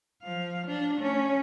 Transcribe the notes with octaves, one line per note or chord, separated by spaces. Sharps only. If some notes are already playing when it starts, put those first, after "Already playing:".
F3 F5
D4
A3 C#4